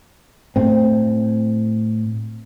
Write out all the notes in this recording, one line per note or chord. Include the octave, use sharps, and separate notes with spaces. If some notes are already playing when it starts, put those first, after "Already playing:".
A2 C4